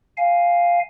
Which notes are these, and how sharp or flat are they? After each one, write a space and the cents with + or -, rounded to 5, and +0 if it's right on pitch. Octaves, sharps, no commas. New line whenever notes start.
F5 +0 G#5 +0